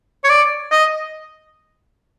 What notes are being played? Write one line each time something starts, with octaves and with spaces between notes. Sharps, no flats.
C#5
D5
D#5